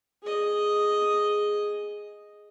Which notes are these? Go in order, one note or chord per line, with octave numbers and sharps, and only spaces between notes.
G#4 D#5